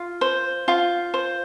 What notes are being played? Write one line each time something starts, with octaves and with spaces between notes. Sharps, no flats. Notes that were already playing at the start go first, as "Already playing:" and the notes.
Already playing: F4
C5
F4
C5